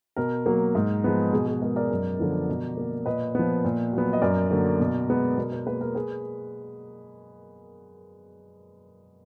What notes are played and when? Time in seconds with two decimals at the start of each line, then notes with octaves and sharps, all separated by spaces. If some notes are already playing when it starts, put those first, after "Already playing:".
0.17 B2 A#4
0.46 F#3 A#3
0.75 G#2
1.04 F3 G#3 B3
1.33 B2 G#4
1.47 G#4
1.62 G#3 B3 A#4
1.76 A#4 D5
1.90 F#2
2.19 D3 F3 B3
2.49 B2
2.77 A#3
3.06 A#2 B4 D#5
3.35 F3 B3
3.65 A#2
3.93 F#3 B3
4.13 D#5
4.22 F#2 A#4 D5
4.51 D3 F#3 A#3
4.80 B2
5.09 G#3 B3
5.38 B2 A#4
5.52 A#4
5.67 A#3 G#4 B4
5.81 A#4
5.95 G#4 B4